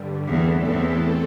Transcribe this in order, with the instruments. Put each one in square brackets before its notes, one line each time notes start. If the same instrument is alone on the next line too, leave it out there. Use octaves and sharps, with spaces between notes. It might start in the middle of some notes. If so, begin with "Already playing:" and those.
Already playing: [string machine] G2 D3 G3
[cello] E2 [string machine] A2 E3 C4 A4
[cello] E2